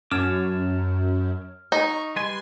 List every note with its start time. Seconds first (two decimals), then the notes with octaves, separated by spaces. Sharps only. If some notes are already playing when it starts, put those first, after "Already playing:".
0.11 F#2 C#5 A5 D6 F6
1.72 D#4 C#6
2.16 G3 B4 G#5 C6